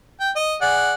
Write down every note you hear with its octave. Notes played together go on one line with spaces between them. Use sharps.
G5
D#5
G#4 D5 F#5